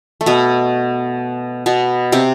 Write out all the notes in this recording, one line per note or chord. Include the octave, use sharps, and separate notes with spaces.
A3
B2 B3
B2 B3
C3 C4